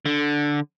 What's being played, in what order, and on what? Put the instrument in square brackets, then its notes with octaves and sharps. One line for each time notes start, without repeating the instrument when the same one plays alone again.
[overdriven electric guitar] D3